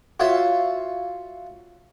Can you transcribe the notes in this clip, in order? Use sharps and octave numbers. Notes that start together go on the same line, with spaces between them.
F4 F#4 C#5 E5 F5